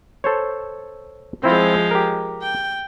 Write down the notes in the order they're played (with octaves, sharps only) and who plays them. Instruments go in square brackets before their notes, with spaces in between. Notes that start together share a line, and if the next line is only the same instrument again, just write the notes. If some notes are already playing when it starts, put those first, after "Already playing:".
[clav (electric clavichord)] A4 C5 C#5
[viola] F3 G#3 [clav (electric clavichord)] C4 E4 F4
[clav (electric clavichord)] G4 A#4
[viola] G5